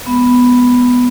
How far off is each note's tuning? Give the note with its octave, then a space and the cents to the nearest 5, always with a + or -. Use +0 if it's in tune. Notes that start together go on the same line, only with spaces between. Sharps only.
G#3 +0 B3 +0